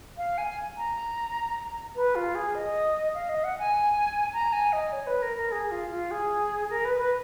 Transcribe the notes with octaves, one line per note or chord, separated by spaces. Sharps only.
F5
G#5
A#5
B4
F4
G#4
D#5
F5
D#5
F#5
G#5
A#5
G#5
D#5
C#5
B4
A#4
A#4
G#4
F4
F4
G#4
A#4
B4
B4